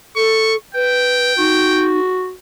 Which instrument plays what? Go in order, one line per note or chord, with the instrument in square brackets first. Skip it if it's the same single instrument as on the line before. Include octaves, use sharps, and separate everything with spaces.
[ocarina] A4 [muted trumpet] C#6
[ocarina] B4 [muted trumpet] G5
[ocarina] D#4 [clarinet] F#4